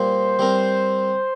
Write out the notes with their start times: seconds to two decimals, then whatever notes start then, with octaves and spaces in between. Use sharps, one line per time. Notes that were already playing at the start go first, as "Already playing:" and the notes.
Already playing: A#2 G3 A#3 C5
0.39 G3 C4 A#4